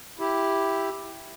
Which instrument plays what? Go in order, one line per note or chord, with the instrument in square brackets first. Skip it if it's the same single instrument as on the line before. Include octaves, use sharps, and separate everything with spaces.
[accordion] E4 G4